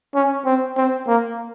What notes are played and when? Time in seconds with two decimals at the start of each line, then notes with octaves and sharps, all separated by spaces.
0.15 C#4
0.45 C4
0.77 C4
1.08 A#3